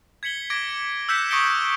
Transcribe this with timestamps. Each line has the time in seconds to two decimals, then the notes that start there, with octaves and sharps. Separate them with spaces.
0.23 G#6 B6 C#7 F#7 G7
0.50 D6 G#6 A#6 D7
1.09 E6 F#6 G6 B6 C#7 E7
1.30 C#6 D#6 A#6 C#7 D7 G7